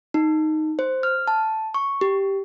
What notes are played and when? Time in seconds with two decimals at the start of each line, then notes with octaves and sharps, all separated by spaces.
0.14 D#4
0.79 C5
1.03 F6
1.28 A5
1.74 C#6
2.01 G4